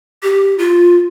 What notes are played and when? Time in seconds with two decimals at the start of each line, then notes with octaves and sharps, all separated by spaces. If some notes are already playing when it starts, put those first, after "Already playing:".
0.23 G4
0.58 F4